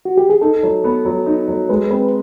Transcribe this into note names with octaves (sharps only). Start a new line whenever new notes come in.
F#4
G4
G#4
D#4 A4
F#3
B3
F#3
D#4
F#3
G#3 B4
C4 B4